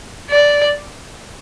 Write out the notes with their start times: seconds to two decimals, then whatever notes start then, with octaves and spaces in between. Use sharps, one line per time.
0.30 D5